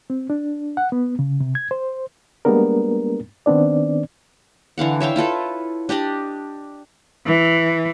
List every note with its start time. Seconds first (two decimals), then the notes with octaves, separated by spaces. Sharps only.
0.10 C4
0.30 D4
0.77 F#5
0.92 B3
1.19 C#3
1.40 C3
1.55 G#6
1.71 C5
2.45 G3 G#3 A#3 B3 D4 A#4
3.46 D#3 B3 C4 D4 D5
4.78 D3 E3 F5 F#5
5.00 C#5 E5 F5 G5
5.16 E4 F4 A4 B4
5.89 D4 G4 D5 D#5
7.26 E3